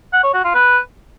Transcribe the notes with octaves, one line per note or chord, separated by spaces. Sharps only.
F#5
C#5
F#4
F4
B4